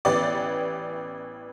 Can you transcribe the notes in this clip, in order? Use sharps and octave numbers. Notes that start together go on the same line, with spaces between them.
A1 E3 B3 G4 D5